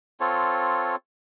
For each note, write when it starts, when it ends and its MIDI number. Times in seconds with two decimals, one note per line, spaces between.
0.20 0.96 60
0.20 0.96 65
0.20 0.96 69
0.20 0.96 73